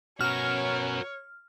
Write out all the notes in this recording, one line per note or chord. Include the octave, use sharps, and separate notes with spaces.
B2 C#4 F#4 A#4 C#5 F6